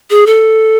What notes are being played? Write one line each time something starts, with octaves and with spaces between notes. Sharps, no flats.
G#4
A4